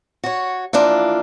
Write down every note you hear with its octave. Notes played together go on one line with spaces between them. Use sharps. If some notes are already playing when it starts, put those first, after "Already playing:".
F#4 C#5
E3 F3 A#3 D4 F4